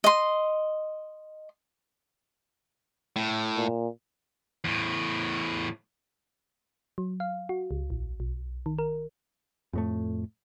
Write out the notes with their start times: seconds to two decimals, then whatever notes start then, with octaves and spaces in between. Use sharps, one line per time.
0.04 D#5 C6
3.16 A2
3.56 A#2
4.64 E2 A2
6.98 F#3
7.20 F5
7.49 F#4
7.71 C#2
7.90 A#1
8.20 B1
8.66 D#3
8.79 A#4
9.73 F2 A2 A3